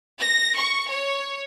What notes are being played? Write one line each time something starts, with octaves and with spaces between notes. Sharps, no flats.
A#6
C#6
C#5